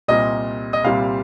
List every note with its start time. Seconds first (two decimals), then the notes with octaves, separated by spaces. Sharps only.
0.08 C2 A#2 G3 C4 D#5
0.73 D#5
0.84 C2 A#2 G3 C4 F5